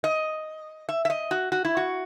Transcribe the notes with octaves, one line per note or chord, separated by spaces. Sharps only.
D#5
E5
E5
D#5
F#4
F#4
E4
F#4